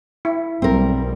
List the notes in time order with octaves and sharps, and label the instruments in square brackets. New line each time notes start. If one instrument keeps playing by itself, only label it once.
[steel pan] E4
[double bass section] B1 G3 [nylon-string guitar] C4 A#4